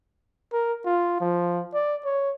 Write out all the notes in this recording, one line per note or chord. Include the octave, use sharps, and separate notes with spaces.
A#4
F4
F3
D5
C#5